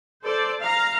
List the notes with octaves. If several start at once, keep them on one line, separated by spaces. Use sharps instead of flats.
A4 C5 D5
F5 A#5